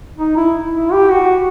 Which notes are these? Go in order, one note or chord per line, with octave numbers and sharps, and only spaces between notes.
D#4
E4
E4
G4
F#4